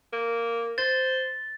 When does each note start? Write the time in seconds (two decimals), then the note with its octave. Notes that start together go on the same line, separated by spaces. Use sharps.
0.13 A#3
0.78 C5 A6